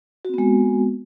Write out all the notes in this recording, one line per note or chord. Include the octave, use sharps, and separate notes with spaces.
G#3 B3 C4 F#4